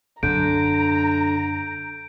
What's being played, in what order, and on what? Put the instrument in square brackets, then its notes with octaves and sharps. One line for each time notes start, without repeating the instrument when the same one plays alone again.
[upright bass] F#2 [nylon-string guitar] D3 [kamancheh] A#5 [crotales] G6 D7